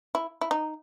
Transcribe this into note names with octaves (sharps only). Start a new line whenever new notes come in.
E4
E4
D#4